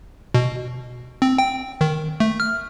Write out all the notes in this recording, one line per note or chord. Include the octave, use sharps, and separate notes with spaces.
B2
C4
G5
D#3
A3
F6